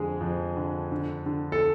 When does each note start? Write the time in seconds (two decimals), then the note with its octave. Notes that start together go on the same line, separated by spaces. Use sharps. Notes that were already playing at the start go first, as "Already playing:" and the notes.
Already playing: F2 D3 G#3 G#4
0.20 F2
0.57 D3
0.92 D3
1.26 D3
1.52 A4